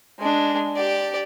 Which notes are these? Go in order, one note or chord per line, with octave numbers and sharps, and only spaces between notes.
G#3 D4
G4 D5